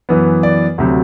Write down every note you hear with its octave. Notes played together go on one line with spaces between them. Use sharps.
F#2 E3 B3
D5
D2 C3 F#3